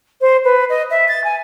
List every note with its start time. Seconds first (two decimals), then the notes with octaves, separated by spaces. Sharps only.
0.21 C5
0.44 B4
0.69 D#5
0.90 E5
1.08 A6
1.24 G#5